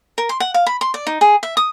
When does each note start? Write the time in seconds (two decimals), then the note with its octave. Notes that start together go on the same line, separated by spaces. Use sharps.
0.18 A#4
0.29 C6
0.40 F#5
0.54 F5
0.67 B5
0.81 C6
0.94 D5
1.07 D#4
1.21 G#4
1.43 E5
1.57 D#6